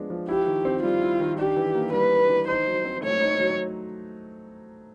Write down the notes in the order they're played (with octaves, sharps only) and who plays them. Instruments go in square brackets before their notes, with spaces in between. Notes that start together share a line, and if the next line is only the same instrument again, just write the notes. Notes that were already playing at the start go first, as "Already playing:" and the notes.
Already playing: [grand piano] F3 G#3 B3 D4
F3
[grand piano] E4 [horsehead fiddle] G4
[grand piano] D#3
C4
[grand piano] G3 [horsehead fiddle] F4
[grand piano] E4
D#3
[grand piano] D4 [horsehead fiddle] G4
[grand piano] E3
A#3
[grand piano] G3 [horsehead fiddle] B4
[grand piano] D4
E3
[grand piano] D#4 [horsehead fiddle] C5
[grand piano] F#3
C4
[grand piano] A3 [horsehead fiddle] C#5
[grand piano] D#4
F#3